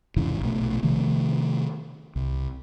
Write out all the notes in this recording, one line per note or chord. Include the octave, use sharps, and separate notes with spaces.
F1 G#2 C#3 E3
A#1 B2 A3
C3 D#3 F3 A3
C2